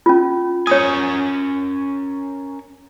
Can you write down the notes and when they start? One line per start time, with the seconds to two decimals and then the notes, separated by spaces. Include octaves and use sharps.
0.06 C#4 F4
0.67 C#4 A#4 C#5 G#5 D#6